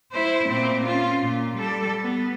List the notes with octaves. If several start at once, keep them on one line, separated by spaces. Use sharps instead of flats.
E4 C5
A#2 C4
C#4 F4
A#2
G3 A4
B3